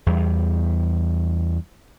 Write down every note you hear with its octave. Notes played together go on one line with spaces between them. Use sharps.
E2 G3